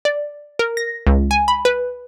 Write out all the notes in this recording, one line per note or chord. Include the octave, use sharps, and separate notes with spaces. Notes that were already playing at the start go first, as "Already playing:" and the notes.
D5
A#4
A#6
C#2
G#5
B5
B4